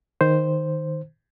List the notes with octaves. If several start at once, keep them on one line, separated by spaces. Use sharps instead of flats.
D#3 C5